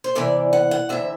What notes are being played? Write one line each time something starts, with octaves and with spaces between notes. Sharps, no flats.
C5
E2 C3 E3 D5
F#5
F#5
D2 C3 E3 E5